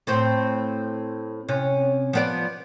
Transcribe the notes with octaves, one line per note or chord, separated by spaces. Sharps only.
A2 C4 C5
C3 C#4
F3 B3 D5